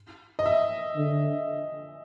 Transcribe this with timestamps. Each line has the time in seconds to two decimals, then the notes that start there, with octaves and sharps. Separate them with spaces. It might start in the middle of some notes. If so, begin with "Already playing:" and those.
0.39 D#5
0.46 E5
0.96 D3